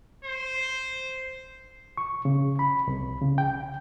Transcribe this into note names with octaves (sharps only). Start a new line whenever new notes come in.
C5
C#6
C#3
B5
C2
C#3
G5